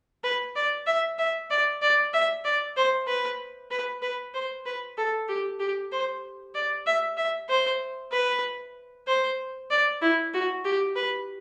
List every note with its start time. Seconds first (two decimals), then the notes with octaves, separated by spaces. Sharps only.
0.24 B4
0.55 D5
0.87 E5
1.19 E5
1.50 D5
1.82 D5
2.13 E5
2.45 D5
2.77 C5
3.07 B4
3.71 B4
4.02 B4
4.34 C5
4.66 B4
4.97 A4
5.28 G4
5.60 G4
5.92 C5
6.55 D5
6.86 E5
7.17 E5
7.49 C5
8.12 B4
9.07 C5
9.70 D5
10.02 E4
10.34 F#4
10.65 G4
10.96 B4